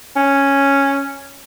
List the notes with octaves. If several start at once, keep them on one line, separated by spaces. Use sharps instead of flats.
C#4